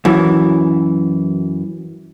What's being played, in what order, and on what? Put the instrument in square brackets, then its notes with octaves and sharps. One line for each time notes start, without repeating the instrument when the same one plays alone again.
[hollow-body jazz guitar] F#2 E3